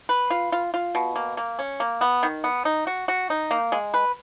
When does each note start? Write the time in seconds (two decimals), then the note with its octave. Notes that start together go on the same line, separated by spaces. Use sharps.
0.09 B4
0.30 F4
0.52 F4
0.74 F4
0.95 B2
1.16 A#3
1.37 A#3
1.59 C#4
1.80 A#3
2.01 B3
2.23 D#3
2.44 B3
2.65 D#4
2.87 F#4
3.08 F#4
3.30 D#4
3.51 A#3
3.72 G#3
3.94 B4